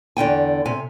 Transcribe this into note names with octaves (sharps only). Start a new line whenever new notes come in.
E2 D3 G5 G#5
C3 G#5